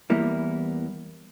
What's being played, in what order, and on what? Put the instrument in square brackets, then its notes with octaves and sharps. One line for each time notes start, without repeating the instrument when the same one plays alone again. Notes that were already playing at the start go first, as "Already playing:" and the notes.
[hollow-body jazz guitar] E2 E3 G3 A#3 E4